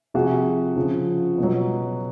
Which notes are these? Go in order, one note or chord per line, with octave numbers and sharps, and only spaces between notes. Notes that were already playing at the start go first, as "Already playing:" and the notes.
C3 F3 F#4 G#4
C#3 F3
B2 F#3